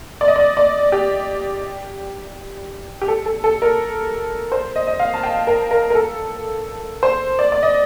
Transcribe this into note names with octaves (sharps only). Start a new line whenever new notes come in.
D5
D#5
D5
D5
G4
G4
A4
A4
A4
A#4
C5
D#5
D#5
F5
A5
G5
A#4
A#4
A#4
A4
C5
D5
D5
D#5